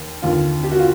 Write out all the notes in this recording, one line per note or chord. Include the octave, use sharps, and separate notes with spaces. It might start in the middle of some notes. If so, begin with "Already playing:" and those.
Already playing: D#2
D#2 D3 F4
G4
F#4
F4